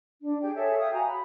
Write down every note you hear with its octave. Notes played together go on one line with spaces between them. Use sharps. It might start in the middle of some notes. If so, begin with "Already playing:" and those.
D4
G4 G#4 G5
G#4 A4 C#5 E5
E5 F5 G5 D#6
F#4 G#5 A#5
B5